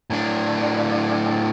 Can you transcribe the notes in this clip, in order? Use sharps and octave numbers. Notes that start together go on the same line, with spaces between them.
A2 D4